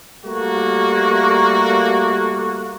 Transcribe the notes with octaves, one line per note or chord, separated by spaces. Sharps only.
G3 A3 A#3 F#4